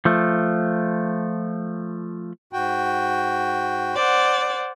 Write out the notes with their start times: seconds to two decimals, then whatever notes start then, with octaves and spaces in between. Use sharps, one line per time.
0.05 F3 A3
2.53 G#2 F#4 G5
3.94 C5 D5 F#5